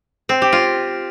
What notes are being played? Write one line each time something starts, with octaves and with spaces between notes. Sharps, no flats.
C4
G4
F4